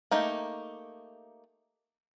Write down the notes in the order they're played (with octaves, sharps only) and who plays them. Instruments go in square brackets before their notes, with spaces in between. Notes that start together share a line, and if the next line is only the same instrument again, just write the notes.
[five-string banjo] A3 A#3 D#4 G4